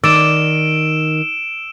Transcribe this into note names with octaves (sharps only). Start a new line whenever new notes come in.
D#3 D5 E6 D7 E7